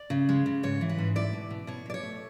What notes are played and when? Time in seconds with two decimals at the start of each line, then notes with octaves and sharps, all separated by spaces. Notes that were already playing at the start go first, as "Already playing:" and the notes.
Already playing: D5
0.10 C#3
0.29 G#3
0.46 C#3
0.63 G#2 C#5
0.81 E3
0.89 B4
0.99 G#2
1.16 E4 D5
1.33 B2
1.50 B2
1.67 B2 C#5
1.86 B2 D5
1.94 C#5
2.03 A3